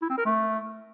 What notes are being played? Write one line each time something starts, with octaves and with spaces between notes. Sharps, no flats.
E4
C4
A#4
A3